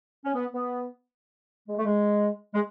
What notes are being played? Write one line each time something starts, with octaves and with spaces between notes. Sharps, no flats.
C#4
B3
B3
G#3
A3
G#3
G#3